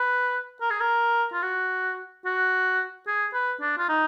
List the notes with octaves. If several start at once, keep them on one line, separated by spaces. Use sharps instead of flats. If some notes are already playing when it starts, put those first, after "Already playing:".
Already playing: B4
A#4
G#4
A#4
F4
F#4
F#4
G#4
B4
D4
F4
D#4